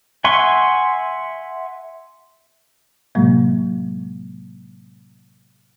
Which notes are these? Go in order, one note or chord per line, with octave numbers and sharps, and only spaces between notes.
E5 F#5 G#5 C6 C#6
A2 C3 F#3 G#3 A#3